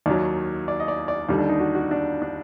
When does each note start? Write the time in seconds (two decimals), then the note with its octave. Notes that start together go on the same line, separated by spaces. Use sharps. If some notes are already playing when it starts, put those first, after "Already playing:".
0.06 D#2 D#3 F#3 D5
0.68 D5
0.80 D#5
0.88 D5
1.08 D5
1.29 D#2 D3 G3
1.38 D4
1.49 D#4
1.60 F#4
1.75 F#4
1.91 D4
2.22 D4